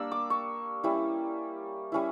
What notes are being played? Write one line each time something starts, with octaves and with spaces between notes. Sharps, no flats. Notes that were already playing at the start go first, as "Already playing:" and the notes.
Already playing: G3 A#3 D4 D5 E6
D6
C#6
G3 C#4 E4
G3 C#4 E4